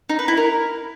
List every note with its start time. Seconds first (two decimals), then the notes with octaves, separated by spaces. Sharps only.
0.09 D#4
0.19 B4
0.28 E4
0.37 A#4